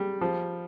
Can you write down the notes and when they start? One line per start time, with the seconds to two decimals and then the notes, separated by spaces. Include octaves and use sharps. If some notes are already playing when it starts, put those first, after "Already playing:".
Already playing: G3
0.21 F3